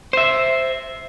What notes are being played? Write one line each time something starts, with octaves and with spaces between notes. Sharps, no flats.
C5 E5